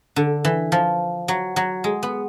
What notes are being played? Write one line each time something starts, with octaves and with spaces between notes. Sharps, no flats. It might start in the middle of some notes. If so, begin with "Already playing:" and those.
D3
E3
F3
F#3
F#3
G#3
B3